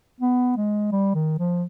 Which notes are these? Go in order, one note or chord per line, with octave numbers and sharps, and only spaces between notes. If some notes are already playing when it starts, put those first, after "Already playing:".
B3
G#3
G3
D#3
F3